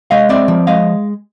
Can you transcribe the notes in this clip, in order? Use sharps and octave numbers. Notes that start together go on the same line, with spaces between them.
G#3 D#5 F5
C4 D5 E5
F3
G#3 D#5 F5